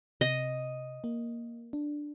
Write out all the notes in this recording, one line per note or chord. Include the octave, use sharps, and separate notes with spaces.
C3 D#5
A#3
D4